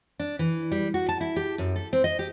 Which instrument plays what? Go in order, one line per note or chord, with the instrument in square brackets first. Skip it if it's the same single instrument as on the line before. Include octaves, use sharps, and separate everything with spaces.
[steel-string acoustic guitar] D4
E3
G3
F#4
A5
E4
G4
F#2
A4
C4
D#5
G4